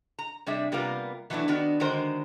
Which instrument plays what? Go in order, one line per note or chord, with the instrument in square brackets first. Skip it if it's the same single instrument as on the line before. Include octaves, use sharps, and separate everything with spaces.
[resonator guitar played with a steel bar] A#5
C3 G3 D4 G#4 E5
C3 G3 A#3 B3 F4 A#4
E3 F#3 A3 B3 D4 E4
D#3 B3 D4 F#4
D3 D#3 G#3 F#4 A#4 C5